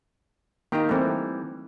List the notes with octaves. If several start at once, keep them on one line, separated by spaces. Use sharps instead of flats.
D#3 A#3 D#4 G4 A#5
E3 G3 A3 C4